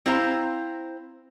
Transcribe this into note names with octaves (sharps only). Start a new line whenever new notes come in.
C4 E4 C5 F5 A#5